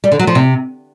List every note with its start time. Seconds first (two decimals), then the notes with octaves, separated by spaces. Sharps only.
0.04 G3
0.12 D3
0.19 F#3
0.27 F3
0.35 C3